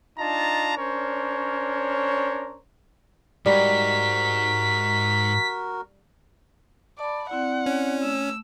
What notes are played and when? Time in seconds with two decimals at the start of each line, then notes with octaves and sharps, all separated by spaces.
0.19 D4 D#4 F4 A5 A#5
0.77 C#4 D4 A#4 C5 C#5
3.46 G#2 G3 F#4 A#4 B6
6.99 D5 A5 B5
7.29 C4 E4 D5 F#5
7.66 C#4
8.03 A3 E6